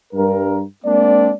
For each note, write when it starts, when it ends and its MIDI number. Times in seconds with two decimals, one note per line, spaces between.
0.13 0.62 43
0.13 0.62 70
0.85 1.33 56
0.85 1.33 58
0.85 1.33 60
0.85 1.33 62
0.85 1.33 74